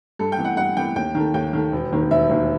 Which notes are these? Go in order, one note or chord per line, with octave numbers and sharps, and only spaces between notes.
G2 A4
G5
E3 B3
F#5
G2 F#5
E3 B3 G5
D#2 G5
D#3 A3
D#2 G5
D#3 A3
E1
D#2 D#3
E1 E5
D#2 D#3